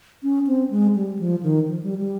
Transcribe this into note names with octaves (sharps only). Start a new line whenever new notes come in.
C#4
C4
G#3
G3
F3
D#3
F3
G3
G3